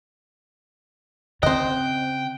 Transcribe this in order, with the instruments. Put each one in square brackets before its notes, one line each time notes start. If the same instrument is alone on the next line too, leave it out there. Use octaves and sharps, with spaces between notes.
[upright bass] C#3 [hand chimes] C4 F#6 [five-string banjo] C5 D#5 [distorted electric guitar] G5